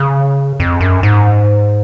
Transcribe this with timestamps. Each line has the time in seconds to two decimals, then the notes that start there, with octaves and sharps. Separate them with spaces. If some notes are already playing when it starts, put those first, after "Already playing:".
Already playing: C#3
0.60 F2
0.81 F#2
1.03 G#2